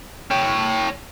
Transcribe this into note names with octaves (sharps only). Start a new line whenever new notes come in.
C#5 G5